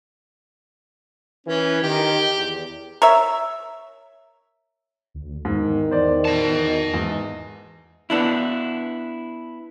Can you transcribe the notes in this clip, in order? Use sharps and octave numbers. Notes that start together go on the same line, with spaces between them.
E3 C#4 B4
D#3 G4
E2
A#4 C#5 E5
D2
E2 G#2 D#3
C5 D5
D#5 A5
E2 G#2
B3 D4 E4